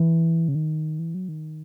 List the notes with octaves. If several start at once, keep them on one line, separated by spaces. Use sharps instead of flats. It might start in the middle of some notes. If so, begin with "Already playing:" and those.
Already playing: E3
C#3
D#3
E3
F#3
D#3